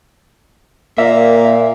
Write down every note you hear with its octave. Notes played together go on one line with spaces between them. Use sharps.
A#2 A#3 E5